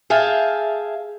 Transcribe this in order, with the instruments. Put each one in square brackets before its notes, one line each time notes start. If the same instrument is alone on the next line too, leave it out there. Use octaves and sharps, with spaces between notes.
[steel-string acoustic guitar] G#4 E5 F5 G5 A5